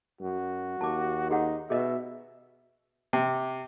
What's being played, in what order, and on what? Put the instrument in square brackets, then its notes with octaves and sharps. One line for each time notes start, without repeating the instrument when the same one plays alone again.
[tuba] F#2 [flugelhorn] F#4
[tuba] D#2 [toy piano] A5 D6
[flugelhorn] D#4 [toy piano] G4 G#4 F#5
[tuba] B2 [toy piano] G#4 D#5 [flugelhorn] E5
[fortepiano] C3